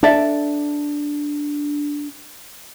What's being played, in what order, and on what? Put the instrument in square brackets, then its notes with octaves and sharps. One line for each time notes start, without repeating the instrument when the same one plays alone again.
[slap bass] D4 [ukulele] A4 D5 E5